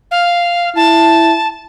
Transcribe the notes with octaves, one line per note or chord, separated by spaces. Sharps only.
F5
E4 A5